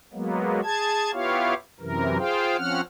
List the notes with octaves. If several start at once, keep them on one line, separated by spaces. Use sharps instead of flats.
F#3 G#3 A#3 B3
G#4 A5 G#6
B3 E4 F4 G4 C#5 F5
F#2 C3 E3 A#4
F4 G#4 C5 F5 G5
F3 C4 C#4 F#5 F6